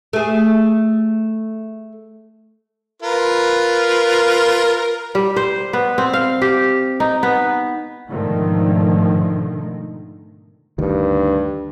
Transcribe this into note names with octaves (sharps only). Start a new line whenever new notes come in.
A3 G#4
F4 A#4 B4
G3
C5
B3
C4
F5
G4
D#4
B3
G#2 B2 D3 D#3 F3 A3
D2 G2 D#3